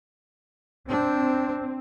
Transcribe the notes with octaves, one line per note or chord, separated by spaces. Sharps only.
C4 D4